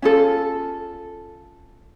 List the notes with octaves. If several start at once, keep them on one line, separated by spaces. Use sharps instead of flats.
C#4 F4 A4